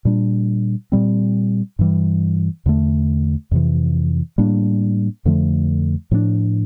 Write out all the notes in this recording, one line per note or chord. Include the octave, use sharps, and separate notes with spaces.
A#2 G3 D4
A#2 G3 C4
G2 E3 G3
E2 D3 A3
F2 C3 E3
A2 G3 A#3 D4
F2 D3 F3 A3
A2 F3 A3 D4